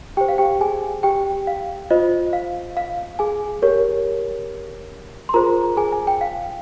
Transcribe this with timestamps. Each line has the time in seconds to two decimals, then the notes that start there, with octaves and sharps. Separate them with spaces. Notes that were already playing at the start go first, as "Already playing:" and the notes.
0.17 G4 C5 G5
0.28 F5
0.38 G4 G5
0.61 G#4 G#5
1.03 G4 G5
1.47 F5
1.91 F4 C5 D#5
2.33 F5
2.77 F5
3.19 G#4 G#5
3.62 G4 A#4 C#5
5.29 C6
5.34 F4 G#4 A#4 C5 A#5
5.77 G#4 G#5
5.92 G#5
6.07 G5
6.21 F5